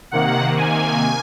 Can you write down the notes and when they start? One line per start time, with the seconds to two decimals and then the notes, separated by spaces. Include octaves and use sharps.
0.11 C3 D#3 A#3 F#5
0.57 G#5